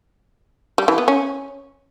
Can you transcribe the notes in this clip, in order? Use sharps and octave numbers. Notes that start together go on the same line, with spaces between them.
G3
E3
B3
C#4